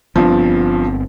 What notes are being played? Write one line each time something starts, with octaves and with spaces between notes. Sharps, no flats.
G1 G2 F3 B3 C4